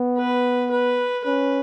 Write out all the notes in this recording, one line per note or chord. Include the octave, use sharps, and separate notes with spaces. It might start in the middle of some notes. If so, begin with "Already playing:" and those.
Already playing: B3
B4
B4
C#4 B4